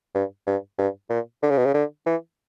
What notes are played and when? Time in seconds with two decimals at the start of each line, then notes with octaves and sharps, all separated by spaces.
0.14 G2
0.46 G2
0.78 G2
1.10 A#2
1.42 D3
1.50 C#3
1.58 B2
1.65 C#3
1.74 D3
2.06 E3